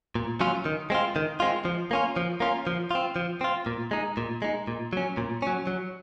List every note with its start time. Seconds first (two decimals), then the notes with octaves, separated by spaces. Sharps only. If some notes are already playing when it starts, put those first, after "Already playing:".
0.15 A#2
0.41 F#3 C#4 F4
0.65 D#3
0.90 G#3 C4 F4
1.16 D#3
1.40 G#3 C4 F4
1.65 F3
1.91 A#3 C#4 F4
2.16 F3
2.40 A#3 C#4 F4
2.67 F3
2.91 C4 F4
3.16 F3
3.41 C4 F4
3.66 A#2
3.91 G#3 D#4
4.17 A#2
4.42 G#3 D#4
4.68 A#2
4.93 F#3 C#4
5.17 A#2
5.42 F#3 C#4
5.67 F#3